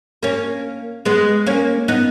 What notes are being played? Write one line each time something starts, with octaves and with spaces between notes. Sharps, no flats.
A#3 C#4
G#3 B3
A#3 C#4
B3 D#4